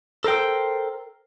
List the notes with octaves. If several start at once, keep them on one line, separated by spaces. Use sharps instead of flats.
A4 A#4 C5 G5